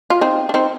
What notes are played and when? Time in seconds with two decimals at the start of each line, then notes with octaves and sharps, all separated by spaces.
0.10 F4
0.21 C4 D#4
0.49 D4
0.54 C4 D#4